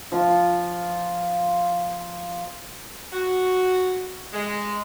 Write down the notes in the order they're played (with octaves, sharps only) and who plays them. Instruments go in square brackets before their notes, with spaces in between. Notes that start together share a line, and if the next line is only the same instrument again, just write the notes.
[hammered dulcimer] F3 F4
[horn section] F#4
G#3